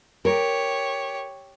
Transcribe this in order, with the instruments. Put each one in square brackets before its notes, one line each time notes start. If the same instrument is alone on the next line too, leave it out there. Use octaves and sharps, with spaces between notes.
[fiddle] G4 C#5 [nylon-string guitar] A#4